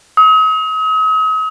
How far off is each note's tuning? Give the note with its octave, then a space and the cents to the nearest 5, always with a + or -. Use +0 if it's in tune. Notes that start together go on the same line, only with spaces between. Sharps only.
D#6 +40